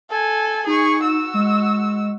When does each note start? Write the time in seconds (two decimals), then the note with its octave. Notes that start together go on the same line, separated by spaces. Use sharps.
0.10 A4 G#5
0.67 D#4 G#4 C#6
1.03 F#4 E6
1.34 G#3